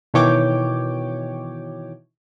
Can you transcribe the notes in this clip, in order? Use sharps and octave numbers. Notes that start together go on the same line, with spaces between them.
B2 D#3 E3 C#5 G5 D6